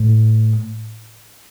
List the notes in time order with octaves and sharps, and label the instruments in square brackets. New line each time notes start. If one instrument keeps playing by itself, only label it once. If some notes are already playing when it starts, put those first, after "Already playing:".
Already playing: [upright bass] A2